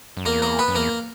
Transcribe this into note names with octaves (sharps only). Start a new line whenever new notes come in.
F#2
E2 A#3 A#4
A#3 A#4
B3 B4
F#2
E2 A#3 A#4